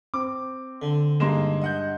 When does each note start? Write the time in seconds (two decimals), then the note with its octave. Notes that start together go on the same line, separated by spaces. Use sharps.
0.14 C4 D6
0.82 D3
1.20 G2 G#3 A#3 D#4 C6 E7
1.62 D#5 F#5 G6